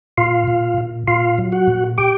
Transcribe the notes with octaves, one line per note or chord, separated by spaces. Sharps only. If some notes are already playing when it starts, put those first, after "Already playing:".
A#2 F4 F5
A#2
A#2
A#2 F4 F5
F#3
F#4 F#5
A#2
G4 G5